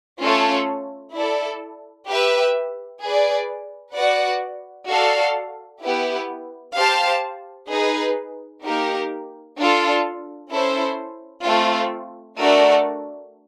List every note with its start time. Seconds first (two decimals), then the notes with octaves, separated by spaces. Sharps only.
0.20 A3 C#4 F4 A4 C#5
1.13 E4 A4 D5
2.08 G4 B4 E5
3.02 G#4 B4 D5
3.95 F#4 B4 D5 F#5
4.88 F#4 A4 D5 F5
5.82 B3 E4 G4 B4
6.76 G4 C5 F5 A5
7.70 D#4 G#4 B4
8.63 A#3 D#4 G4 A#4
9.57 D4 F4 A4
10.50 C#4 E4 A4 C5
11.44 A3 C4 F4
12.38 A3 D4 F#4 A#4 D5